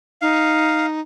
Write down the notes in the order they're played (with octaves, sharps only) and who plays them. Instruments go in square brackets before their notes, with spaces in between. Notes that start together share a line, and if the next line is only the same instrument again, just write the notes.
[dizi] D#4 [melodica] F5